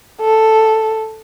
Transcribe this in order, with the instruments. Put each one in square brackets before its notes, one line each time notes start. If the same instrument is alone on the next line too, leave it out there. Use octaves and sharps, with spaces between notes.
[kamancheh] A4